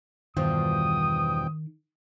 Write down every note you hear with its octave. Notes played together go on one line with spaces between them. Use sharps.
E2 G2 B2 D#3 F3 G5 D#6